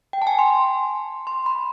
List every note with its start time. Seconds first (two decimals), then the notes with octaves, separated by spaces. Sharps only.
0.13 G5
0.22 A5
0.27 G#5
0.39 C6
1.27 C6
1.46 B5